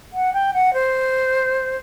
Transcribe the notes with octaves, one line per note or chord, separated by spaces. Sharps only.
F#5
G5
F#5
C5